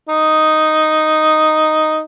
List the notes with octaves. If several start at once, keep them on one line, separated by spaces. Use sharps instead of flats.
D#4